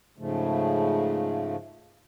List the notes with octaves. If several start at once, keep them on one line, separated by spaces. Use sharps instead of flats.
G#2 C#3 F3 A3